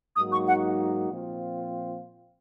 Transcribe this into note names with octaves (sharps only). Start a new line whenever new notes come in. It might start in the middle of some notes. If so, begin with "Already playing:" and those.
G#2 F#3 A#3 D#4 F#4 D#6
C#6
F#5
A#2 F3 C4 F4